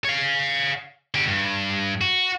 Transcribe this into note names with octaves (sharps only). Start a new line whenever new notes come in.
C#5 F5
D3 G4
G2
F#4